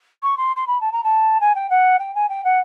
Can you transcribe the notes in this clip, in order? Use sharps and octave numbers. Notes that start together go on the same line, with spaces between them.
C#6
C6
C6
B5
A5
A#5
A5
G#5
G5
F#5
G5
G#5
G5
F#5